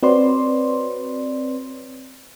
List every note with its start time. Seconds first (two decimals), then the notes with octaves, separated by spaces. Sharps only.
0.03 C4 F#4 B4 C#5 D5 C6